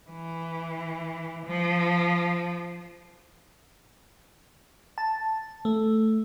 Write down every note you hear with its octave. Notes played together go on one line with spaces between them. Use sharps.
E3
F3
A5
A3